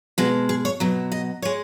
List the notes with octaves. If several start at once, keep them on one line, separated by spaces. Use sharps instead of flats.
B2 G#3 F#4
G#4
C#5
B2 F#3
D#5
G#3 C#5